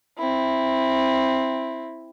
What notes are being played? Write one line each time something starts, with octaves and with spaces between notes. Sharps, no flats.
C4 E4